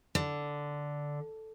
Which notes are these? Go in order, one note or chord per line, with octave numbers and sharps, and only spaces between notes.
D3